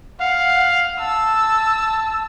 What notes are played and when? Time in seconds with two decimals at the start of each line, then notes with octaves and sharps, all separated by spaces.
0.21 F5 F#5
1.00 A5 E6